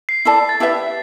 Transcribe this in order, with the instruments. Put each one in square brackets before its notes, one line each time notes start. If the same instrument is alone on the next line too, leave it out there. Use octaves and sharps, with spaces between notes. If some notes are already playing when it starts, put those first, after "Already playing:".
[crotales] C7
[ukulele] E4 A4 D5 A5 [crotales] C7
[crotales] A6
[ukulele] E4 G4 B4 E5